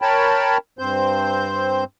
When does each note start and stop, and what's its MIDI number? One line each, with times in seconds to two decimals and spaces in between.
0.02 0.58 70
0.02 0.58 73
0.02 0.58 79
0.02 0.58 81
0.02 0.58 83
0.79 1.84 43
0.79 1.84 60
0.79 1.84 72
0.79 1.84 91